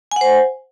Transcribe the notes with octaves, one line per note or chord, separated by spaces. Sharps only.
C5 F#5 G#5